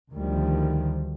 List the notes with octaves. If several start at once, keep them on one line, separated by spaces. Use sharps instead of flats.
D2 D#3 F3 G3